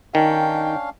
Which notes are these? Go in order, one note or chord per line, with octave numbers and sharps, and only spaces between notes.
D#3 C#4 D4 F5 G5